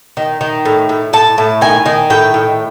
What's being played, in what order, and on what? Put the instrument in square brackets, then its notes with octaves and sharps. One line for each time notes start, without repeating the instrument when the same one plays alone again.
[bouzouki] D#3
D#3
A2
A2
A2 A5
A2
D#3 G#5
D#3
A2 G5
A2